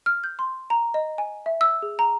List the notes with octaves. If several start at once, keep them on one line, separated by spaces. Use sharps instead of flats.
F6
G6
C6
A#5
D#5
G#5
E5
E6
G#4
A#5